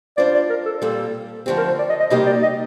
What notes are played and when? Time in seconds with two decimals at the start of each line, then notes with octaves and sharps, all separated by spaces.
0.17 G3 D4 F4 C5 D5
0.34 D5
0.50 A#4
0.66 A4
0.82 A#2 G3 C4 A4
1.46 D3 F3 A3 C4 G4
1.57 A#4
1.68 C5
1.79 D5
1.89 D#5
2.00 D#5
2.10 C3 G3 A#3 D#4 G4 D#5
2.26 D5
2.43 D#5